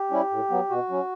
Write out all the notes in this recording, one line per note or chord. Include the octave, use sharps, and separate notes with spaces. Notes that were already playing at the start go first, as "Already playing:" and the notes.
Already playing: G4
G3 C#4 E4
A2
F#3 B3
B2 F#4
F#3 C#4